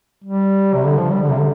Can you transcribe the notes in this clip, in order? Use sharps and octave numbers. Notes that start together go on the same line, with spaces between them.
G3
C3
D3
F3
G3
D3
C3
D3